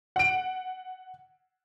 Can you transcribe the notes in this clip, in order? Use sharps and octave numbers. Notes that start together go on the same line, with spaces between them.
F#5 D7